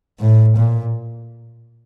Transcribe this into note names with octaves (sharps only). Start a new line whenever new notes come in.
A2
A#2